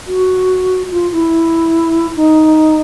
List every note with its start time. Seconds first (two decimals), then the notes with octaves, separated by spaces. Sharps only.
0.07 F#4
0.91 F4
1.12 E4
2.16 D#4